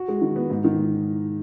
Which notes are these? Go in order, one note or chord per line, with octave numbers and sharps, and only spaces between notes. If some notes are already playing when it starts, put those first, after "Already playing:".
Already playing: F#4
G#3
D#3
B3
G#2
D#3
G#2